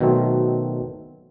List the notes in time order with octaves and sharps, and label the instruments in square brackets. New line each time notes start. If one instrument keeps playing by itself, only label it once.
[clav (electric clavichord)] B2 D#3 F#3 A3 C4